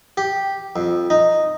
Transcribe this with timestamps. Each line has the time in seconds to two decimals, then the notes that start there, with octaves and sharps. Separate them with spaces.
0.17 G4
0.76 F2
1.10 D#4